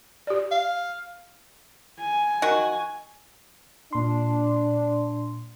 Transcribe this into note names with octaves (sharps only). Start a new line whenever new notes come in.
G4 D5
F5
G#5
D#3 F#4
A#2 D4 C6